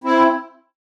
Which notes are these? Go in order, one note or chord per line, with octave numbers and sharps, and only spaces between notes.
C4 E4